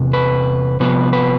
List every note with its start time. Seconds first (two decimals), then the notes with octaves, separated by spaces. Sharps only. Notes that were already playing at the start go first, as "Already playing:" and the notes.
Already playing: E2 C3
0.13 B4
0.80 C3 F3 B3 B4
1.13 B4